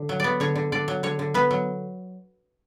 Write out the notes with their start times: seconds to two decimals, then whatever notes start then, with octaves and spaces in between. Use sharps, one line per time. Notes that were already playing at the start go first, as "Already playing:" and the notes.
Already playing: D3
0.09 F#3
0.20 B3 D5
0.40 D3 C#5
0.55 D3
0.72 D3 D5
0.88 F#3
1.03 D3 C#5
1.19 D3
1.34 B3 B4
1.51 F#3